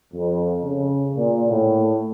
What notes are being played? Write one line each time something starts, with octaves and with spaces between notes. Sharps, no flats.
F2
C#3
A#2
A2